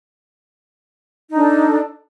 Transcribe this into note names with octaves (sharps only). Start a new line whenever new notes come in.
D4 D#4 A4